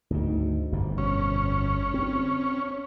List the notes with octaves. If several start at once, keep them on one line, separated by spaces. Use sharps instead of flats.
D2 G#2 D#3
G1 F2 B2
C#4
C4